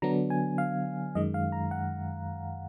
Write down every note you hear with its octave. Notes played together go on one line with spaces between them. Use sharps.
D3 F#3 B3 D4 A#5
G#5
F5
F#2 D#3 G#3 D#5
F5
A#5
F#5